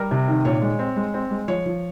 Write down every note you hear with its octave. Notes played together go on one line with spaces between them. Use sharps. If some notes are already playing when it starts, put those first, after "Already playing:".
Already playing: G3 A#4
C3
D#3
A#2 C#5
G#3
C4
G#3
C4
G#3
F3 C#5
F3